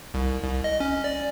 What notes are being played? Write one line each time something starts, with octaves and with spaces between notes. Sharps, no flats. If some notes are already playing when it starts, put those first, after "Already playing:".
C2
C2
D#5
C#4
D5